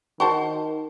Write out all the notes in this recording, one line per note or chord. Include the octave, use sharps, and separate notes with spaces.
D#3 F#4 C5 A5